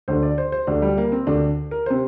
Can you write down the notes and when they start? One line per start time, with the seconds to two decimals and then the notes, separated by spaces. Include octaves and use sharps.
0.08 D2 D3 C5
0.23 D5
0.38 C5
0.52 C5
0.67 D2 D3 D4
0.82 G3
0.98 A#3
1.12 C4
1.27 D2 D3 D4
1.71 A#4
1.86 C3 C5